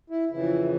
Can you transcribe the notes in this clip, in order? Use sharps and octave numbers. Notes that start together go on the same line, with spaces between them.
E4
F2 C#3 E3 E4